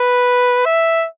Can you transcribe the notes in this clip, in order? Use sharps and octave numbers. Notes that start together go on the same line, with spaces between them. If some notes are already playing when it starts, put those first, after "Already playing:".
Already playing: B4
E5